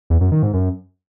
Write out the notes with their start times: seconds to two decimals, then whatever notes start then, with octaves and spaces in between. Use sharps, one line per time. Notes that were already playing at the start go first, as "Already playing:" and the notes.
0.10 E2
0.21 F#2
0.32 D#3
0.43 G#2
0.53 F#2